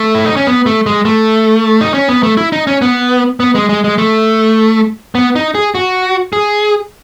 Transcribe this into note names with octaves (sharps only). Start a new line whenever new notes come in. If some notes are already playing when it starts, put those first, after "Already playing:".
Already playing: A3
E4
D#4
C#4
B3
A3
G#3
A3
D#4
C#4
B3
A3
E4
D#4
C#4
B3
B3
G#3
G#3
G#3
A3
B3
D#4
G#4
F#4
G#4